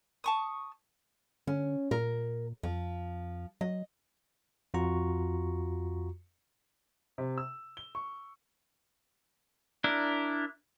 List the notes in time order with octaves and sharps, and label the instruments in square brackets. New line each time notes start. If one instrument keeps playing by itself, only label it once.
[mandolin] A5 C#6 D#6
[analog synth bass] D3 [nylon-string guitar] C#4
[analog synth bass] A#2 [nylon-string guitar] A#4
[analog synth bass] F2 [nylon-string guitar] F3
[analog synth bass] F#3 [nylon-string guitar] D#5
[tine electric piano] F2 F4 F#4 A#5 C#6
[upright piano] C3
E6
G7
C#6
[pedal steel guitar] D4 E4 A#4